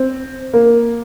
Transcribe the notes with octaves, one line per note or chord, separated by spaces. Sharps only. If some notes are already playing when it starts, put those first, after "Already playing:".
Already playing: C4
A#3